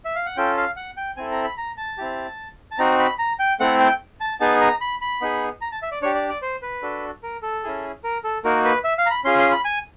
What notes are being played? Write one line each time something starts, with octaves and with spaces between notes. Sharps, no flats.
E5
F5
F#5
C#4 F4 A4 G5
F5
F#5
G5
C4 E4 A4 G#5
A#5
B5
A#5
A5
C4 E4 G4
A5
C4 D#4 F#4 A#5
B5
A#5
G5
A3 C4 E4 A4 F#5
G5
A5
B3 D#4 G#4 A5
A#5
B5
B5
B3 D#4 G#4
A#5
A5
E5
D5
D4 G4 C#5
D5
D5
C5
B4
D4 F#4 A4
A#4
A4
C#4 E4 G#4
A#4
A4
A#3 D#4 F#4 A#4
B4
E5
F5
A#5
B5
C#4 F4 G#4 C6
C6
B5
G#5